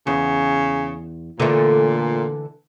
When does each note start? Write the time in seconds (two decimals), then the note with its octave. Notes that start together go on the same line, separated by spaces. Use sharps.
0.07 E2 C#3
1.40 A#2 D3 E3 A3